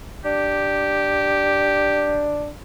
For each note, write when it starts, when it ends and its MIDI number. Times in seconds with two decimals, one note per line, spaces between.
0.25 2.49 62
0.25 2.27 67